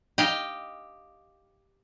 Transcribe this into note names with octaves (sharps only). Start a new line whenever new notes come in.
G4 D#5 F5 G5